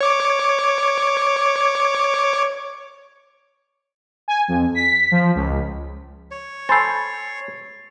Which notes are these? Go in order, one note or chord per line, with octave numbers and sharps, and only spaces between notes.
C#5 D6
G#5
F2
B6
F3
C#2
C#5
A4 C5 G#5 B5 A6 C7